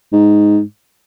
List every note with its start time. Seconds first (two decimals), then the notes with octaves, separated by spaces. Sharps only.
0.13 G#2